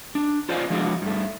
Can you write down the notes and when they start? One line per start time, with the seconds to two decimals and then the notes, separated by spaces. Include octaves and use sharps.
0.15 D4
0.49 F4 C5 D5 D#5 F5 G#5
0.70 F3 F#3 G#3 D4 E4 F#4
1.02 G2 A3